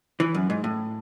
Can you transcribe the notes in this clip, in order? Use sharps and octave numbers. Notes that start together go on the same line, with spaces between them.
E3
F#2
G#2
A2